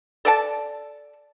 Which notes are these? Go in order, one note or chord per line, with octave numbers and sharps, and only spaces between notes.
A4 D5 F#5 A5